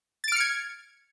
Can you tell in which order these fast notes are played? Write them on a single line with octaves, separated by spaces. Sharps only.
A6 D7 F6 C#7 G#6